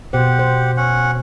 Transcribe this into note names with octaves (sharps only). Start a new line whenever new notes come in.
B2 G4 C5 F#5
C5
C#4 F#5